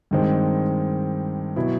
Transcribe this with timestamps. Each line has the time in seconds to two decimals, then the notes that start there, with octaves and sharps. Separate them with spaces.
0.11 G2 D#3 G#3 C4
1.56 B2 F#3 B3 E4